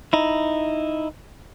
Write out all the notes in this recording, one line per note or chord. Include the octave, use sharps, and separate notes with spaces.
D#4 E4